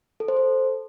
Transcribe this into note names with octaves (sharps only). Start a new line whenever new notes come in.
A4
C5
A4